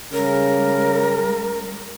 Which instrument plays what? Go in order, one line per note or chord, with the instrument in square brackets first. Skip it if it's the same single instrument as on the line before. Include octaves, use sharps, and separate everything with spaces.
[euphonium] C#3 [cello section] G3 G#3 [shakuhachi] A#4